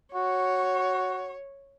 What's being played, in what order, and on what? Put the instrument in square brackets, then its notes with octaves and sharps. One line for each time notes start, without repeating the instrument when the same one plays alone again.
[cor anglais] F#4 [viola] C#5